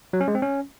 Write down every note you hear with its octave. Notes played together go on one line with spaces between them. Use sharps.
F#3
C#4
G#3
C4
C#4